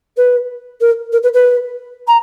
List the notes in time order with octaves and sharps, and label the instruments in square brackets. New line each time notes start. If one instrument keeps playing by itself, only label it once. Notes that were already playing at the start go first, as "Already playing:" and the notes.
[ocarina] B4
A#4
A#4
B4
B4
A#5